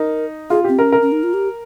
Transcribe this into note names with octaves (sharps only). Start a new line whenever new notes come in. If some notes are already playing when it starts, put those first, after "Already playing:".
Already playing: D#4 A#4
F4 G#4
C4 G4
C#4 A#4
A#4
C#4
D#4
F4
G4